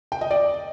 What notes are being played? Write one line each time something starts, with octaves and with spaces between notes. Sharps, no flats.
G5
D#5
D5